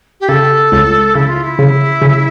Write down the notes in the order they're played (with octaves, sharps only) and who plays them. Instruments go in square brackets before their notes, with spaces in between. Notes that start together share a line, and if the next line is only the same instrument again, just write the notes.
[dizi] G4
[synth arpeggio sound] C#3 [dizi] A4
[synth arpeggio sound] C#2
[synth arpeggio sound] C#3 [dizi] E4
[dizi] F4
E4
[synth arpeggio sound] C#3
C#3